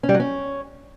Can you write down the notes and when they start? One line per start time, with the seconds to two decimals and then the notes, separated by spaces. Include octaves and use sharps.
0.03 C#4
0.09 G3
0.14 F#3
0.20 C#4